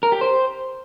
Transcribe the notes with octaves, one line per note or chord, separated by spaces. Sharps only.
A#4
G4
C5